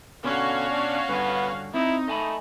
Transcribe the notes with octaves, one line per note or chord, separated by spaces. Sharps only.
B2 D3 C#4 F#4 F5
D4
G2 D3 B3
C4 D#4 E4
A3 D#5 G#5 B5